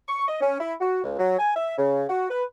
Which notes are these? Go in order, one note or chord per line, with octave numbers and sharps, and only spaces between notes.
C#6
D#5
C#4
E4
F#4
C#2
F#3
G#5
E5
C#3
F#4
B4